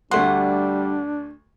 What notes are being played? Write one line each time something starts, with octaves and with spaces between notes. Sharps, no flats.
D2 G3 A3 D4 F#5 C6